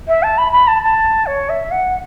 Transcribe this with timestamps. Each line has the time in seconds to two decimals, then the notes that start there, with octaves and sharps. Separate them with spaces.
0.08 E5
0.23 A5
0.38 B5
0.52 B5
0.68 A5
0.83 A5
1.26 C#5
1.49 E5
1.71 F#5